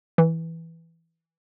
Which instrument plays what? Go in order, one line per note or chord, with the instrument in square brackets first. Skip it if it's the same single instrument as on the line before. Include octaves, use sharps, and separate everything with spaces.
[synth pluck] E3